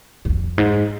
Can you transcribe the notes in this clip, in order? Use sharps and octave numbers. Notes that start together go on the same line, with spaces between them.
F#2
F2
G#2